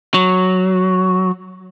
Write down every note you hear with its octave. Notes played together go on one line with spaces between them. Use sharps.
F#3